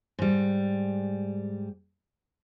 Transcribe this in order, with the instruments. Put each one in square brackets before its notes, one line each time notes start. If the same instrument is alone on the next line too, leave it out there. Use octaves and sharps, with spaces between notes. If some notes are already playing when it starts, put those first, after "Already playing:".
[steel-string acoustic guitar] G#2 G3